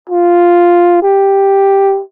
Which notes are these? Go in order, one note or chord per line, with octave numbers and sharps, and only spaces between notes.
F4
G4